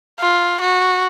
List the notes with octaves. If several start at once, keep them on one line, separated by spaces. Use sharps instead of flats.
F4
F#4